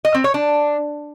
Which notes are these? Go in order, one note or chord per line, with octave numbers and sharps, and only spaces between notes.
D#5
C4
C#5
D4